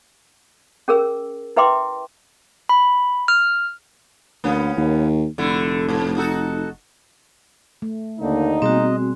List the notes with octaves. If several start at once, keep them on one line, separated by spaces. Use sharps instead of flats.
C#4 G#4 A#4 E6
E4 B4 E5 G5 C6 D6
B5
F6
D2 A#3 B3 C#4
D#2
F1 D3 A3 E4
G#2 B2
D#4 F#4 A4
A3
D#2 D3 A#3 D#4
B2 G3 C4 F#4 G#4 D#5